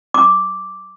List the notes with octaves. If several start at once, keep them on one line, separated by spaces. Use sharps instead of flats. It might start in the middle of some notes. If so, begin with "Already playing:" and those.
D6